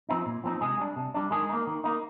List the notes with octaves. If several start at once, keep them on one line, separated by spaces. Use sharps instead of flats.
F3 C4 D#4
A#2
F3 C4 D#4
C3 G#3 G#4
G3 D4
C3
G3 D4
D#3 G#3 G#4
A#3 D#4
D#3
A#3 D#4